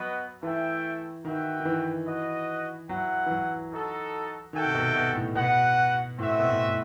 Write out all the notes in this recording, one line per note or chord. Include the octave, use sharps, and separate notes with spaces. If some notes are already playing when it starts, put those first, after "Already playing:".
Already playing: F#3 B3 F#4 B4 D#5
E3 A3 E4 A4 E5 G5
D#3 F#4 B4 E5 G5
D#3
E3
F#4 B4 D#5
F#3 E4 B4 F#5
E3
F#3
D#4 F#4 A4
D#3 F#4 A4 E5 G5
C3
B2
B2
A2
B2 F#4 B4 F#5
A2 C4 F#4 B4 E5
B2
A2
A2